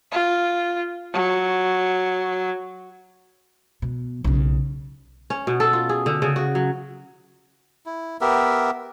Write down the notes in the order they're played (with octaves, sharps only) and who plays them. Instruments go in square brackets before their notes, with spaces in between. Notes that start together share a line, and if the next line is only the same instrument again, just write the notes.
[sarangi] F4
F#3
[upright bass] B2
B1 C#3
[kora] C#4
B2
A4
F4
G#4
D3
C#3
F#4
F#3
[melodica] E4
B3 G4 A#4 E5